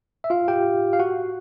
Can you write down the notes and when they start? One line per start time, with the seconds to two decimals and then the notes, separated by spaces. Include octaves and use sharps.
0.24 E5
0.30 F4 F5
0.48 G4 G5
0.93 F5
0.99 F#4 F#5